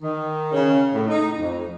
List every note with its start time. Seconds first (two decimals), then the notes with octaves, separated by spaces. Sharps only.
0.02 D#3
0.53 C#3
0.93 A2
1.07 D#4
1.39 F2